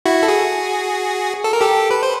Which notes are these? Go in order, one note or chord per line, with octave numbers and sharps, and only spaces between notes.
E4 F#4
A4
F#4 G#4
A4
A#4
G4 A4
B4
C5